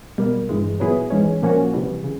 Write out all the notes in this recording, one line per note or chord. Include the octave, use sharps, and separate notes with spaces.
B2 G3 A#3
G2 E3 G#3
A#2 F#3 B3 E4 G#4
G#2 E3 G#3 C#4
A#2 F3 A#3 C#4 F#4
C3 E3 G3
C#3